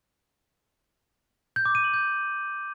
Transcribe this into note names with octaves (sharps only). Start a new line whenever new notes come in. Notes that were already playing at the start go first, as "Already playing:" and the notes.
G6
D6
D#7
F#7
G6